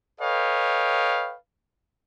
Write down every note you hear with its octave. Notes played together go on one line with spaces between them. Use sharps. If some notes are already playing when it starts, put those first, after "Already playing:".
A4 B4 C#5 D#5 F5 G5